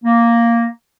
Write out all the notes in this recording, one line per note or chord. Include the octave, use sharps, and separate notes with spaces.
A#3